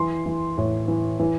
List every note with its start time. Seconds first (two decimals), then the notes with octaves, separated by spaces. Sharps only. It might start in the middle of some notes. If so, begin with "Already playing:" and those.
Already playing: E3 C6
0.26 E3
0.57 A2
0.88 E3
1.20 E3